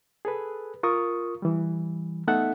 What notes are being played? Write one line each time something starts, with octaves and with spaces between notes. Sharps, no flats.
G#4 A4 B4
F4 A#4 C#6 D#6
E3 G3
A3 B3 D#4 A4 E5 F#5